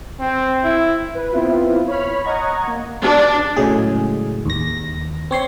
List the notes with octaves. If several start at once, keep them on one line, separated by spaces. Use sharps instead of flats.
C4
E4
B4
B3 C4 E4 F4
C#5 B5 F6
D#5 F#5 A#5 C#6 G#6
A#3
D4
A2 C#3 F#3 G#3 G#4
D#2 A#6
C4 C#5 C6